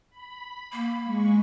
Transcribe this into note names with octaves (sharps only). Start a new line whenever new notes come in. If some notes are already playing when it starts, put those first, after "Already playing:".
B5
A#3
G#3 C#6